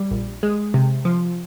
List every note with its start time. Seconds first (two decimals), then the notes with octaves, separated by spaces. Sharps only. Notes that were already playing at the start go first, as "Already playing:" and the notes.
Already playing: G3
0.11 A#1
0.43 G#3
0.74 C3
1.05 F3